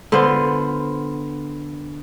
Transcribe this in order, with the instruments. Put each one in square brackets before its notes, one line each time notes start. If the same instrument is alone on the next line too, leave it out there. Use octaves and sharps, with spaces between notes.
[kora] D3 B3 F4 C5